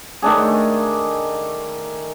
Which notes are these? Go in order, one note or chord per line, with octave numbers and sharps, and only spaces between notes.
D#3 A3 D4 G#4